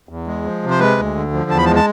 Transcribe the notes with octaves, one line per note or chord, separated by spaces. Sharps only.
E2
G#3
F3
C3
C5
G#3 B4
D2
D3
F3
E2 A5
B5
G#3 A5
A5